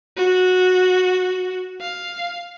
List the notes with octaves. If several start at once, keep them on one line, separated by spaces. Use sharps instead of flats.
F#4
F5